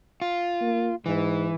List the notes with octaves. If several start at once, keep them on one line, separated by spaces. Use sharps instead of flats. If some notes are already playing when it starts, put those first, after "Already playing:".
F4
A#3
G#2 E3